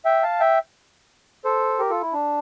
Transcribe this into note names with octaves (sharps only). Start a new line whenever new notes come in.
E5 G5
F5 A5
E5 G5
A4 C5
G4 A#4
F4 A4
E4
D4